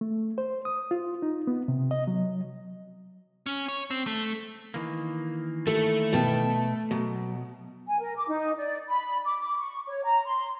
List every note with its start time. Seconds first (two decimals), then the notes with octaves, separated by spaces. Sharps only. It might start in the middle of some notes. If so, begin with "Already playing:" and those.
0.01 A3
0.38 C5
0.65 D#6
0.91 F4
1.22 D#4
1.47 B3
1.68 C3
1.91 D#5
2.07 F#3
3.46 C#4
3.68 C#5
3.91 C4
4.07 A3
4.74 D#3 E3 A#3
5.67 A3 A4
6.12 B2 G5 A5
6.91 B2 F#3
7.86 G#5
8.00 A#4
8.16 D6
8.28 D#4
8.58 D5
8.87 B5
9.25 D6
9.58 C#6
9.87 C#5
10.04 A#5
10.26 C6